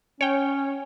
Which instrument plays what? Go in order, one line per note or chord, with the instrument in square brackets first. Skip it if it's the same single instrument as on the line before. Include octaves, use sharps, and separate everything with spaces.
[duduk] C#4 [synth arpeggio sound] C#5 G5